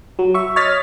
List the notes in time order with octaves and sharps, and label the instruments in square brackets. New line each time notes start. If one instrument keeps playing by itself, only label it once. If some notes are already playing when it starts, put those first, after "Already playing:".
[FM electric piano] F#3
E5 C#6
C#5 D#5 F6 A6 B6